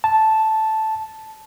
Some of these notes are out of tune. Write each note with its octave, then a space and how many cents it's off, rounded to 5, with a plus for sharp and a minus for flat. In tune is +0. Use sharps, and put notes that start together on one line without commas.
A5 -5